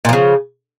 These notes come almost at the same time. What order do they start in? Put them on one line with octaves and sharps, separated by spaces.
A#2 F3 C#3